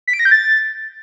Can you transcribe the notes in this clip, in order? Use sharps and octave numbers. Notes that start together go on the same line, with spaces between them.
B6
D7
A#6
G6
A6